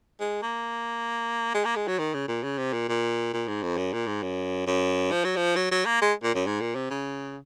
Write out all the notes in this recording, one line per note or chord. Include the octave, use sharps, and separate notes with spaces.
G#3
A#3
G#3
A#3
G#3
F#3
D#3
C#3
A#2
C#3
C3
A#2
A#2
A#2
G#2
F2
F#2
A#2
G#2
F#2
F#2
F3
F#3
F3
F#3
F#3
A#3
G#3
A#2
F#2
G#2
A#2
C3
C#3